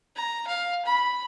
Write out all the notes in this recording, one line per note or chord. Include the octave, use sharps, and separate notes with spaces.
A#5
F5
B5